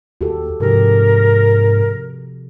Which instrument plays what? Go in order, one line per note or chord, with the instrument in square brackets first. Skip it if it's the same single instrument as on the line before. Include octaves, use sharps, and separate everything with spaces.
[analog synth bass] D#2 [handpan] F#4 G4 A4
[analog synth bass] G#2 [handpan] C3 F3 G4 [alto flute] A#4